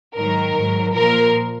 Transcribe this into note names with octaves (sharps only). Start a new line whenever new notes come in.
G#2 D#3 F#3 A#4
G#2 F#3
A#2 F3 A#4